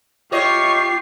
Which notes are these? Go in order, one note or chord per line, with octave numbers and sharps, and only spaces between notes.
E4 F4 G4 C#5 D#5 C#6 C7